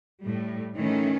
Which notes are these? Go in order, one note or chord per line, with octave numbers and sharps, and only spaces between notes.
A2 G3
D#3 E3 A3 C#4